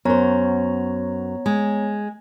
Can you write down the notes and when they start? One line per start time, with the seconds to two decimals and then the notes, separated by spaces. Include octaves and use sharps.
0.05 F#2 B3 C5 C#5 A#5
1.46 G#3